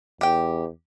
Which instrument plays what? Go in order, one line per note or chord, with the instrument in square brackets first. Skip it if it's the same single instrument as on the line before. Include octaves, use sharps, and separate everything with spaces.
[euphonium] E2 [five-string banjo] G4 G5